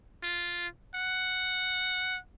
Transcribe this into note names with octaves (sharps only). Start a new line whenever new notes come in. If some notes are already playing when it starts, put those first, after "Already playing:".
F4
F#5